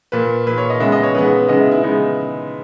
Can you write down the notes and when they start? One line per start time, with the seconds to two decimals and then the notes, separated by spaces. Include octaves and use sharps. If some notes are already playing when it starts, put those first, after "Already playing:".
0.12 A#2 A#3 B4
0.47 A#2 A#3 B4
0.58 C#5
0.70 D#5
0.80 C#3 G#3 B3 E5
0.92 D#5
1.03 C#5
1.15 C#3 G#3 B3 B4
1.49 C#3 G#3 B3 D#5
1.60 E4
1.72 E4
1.83 C#3 G#3 B3 D#4